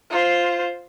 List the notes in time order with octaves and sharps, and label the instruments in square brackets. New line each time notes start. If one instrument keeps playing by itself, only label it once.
[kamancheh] F4 C5